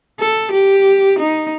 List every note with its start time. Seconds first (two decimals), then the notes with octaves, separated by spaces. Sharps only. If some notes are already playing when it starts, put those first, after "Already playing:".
0.20 A4
0.52 G4
1.19 D#4